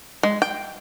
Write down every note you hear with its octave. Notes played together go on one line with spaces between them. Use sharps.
G#3
G5